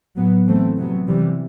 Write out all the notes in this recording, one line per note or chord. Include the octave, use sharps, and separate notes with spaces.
A2 F#3 B3
E3 A3 C4
C3 F#3 B3
C3 E3 G3